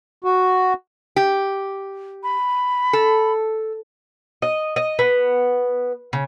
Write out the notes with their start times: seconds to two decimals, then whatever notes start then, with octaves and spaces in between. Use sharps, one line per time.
0.24 F#4
1.16 G4
2.23 B5
2.93 A4
4.42 D#5
4.76 D#5
4.99 B3
6.13 C#3